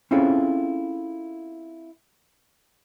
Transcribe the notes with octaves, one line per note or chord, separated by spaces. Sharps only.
C4 C#4 E4 F4 G#4 A4